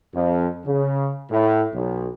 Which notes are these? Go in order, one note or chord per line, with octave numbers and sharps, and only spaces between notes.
F2
C#3
A2
B1